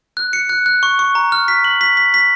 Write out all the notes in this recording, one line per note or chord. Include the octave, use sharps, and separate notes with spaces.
F#6
C#7
F#6
F#6
C#6
C#6
A#5
F6
B6
F#7
B6
B6
B6